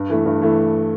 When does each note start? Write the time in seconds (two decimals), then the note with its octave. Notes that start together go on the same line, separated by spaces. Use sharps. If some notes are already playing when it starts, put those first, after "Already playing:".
Already playing: G2
0.09 E3 A3
0.26 G2
0.42 E3 A3